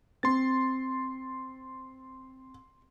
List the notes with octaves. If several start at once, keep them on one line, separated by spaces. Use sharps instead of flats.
C4 C6 A6